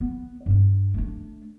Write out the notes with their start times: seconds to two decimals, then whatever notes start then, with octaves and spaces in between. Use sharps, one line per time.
0.01 B3
0.46 G2 D4
0.94 A3 D4